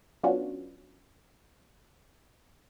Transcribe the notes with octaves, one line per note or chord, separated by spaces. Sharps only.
F#3 B3 C#4 D4 F4 F#4